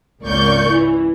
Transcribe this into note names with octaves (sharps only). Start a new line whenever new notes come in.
G#1 C#2 A#3 D5 C#6 G6
E3